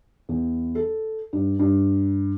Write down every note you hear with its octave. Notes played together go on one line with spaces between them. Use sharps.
E2
A4
G2
G2